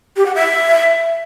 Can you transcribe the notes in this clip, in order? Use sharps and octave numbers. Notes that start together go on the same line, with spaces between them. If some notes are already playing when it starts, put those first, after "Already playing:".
G4
F#5
E5